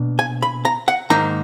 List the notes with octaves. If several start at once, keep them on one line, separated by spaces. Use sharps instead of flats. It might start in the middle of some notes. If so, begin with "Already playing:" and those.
Already playing: B2 A#3 D4
G#5
B5
A#5
F#5
G#2 D#3 A#3 D#4 A#5